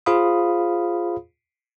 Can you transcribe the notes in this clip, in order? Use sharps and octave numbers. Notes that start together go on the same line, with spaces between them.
F4 G#4 C5 F5 B5 D#6